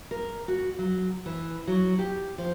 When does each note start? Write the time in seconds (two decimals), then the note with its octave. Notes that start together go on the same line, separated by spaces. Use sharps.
0.11 A#4
0.48 F#4
0.78 F#3
1.26 E3
1.67 F#3
1.99 G4
2.38 F3